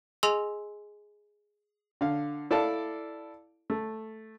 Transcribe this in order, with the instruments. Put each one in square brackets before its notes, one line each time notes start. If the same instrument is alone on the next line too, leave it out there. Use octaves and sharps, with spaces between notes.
[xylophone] G#4 D#5 G#5 C6 E6 F7
[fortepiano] D3 F5
E4 A4 D5 F5 A5
A3